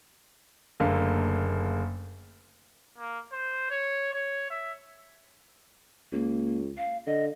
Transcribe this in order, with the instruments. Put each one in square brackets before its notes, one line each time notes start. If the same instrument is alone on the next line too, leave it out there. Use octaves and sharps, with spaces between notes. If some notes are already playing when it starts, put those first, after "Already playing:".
[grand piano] F#1 D3 A3 A#3 F5
[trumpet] A#3
C5
C#5
C#5
E5
[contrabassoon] C#2 [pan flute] A#3
[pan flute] F5
[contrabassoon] D3 [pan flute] D#5